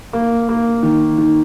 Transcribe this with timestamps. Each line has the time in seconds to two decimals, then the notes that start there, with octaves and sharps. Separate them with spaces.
0.13 A#3
0.49 A#3
0.83 D#3
1.18 D#3